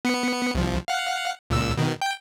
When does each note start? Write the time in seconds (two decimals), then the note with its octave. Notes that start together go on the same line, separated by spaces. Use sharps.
0.05 B3 C#7
0.55 C2 F3
0.88 F5 F#5
1.50 C#2 A#2 E6
1.77 B2 D#3
2.02 G5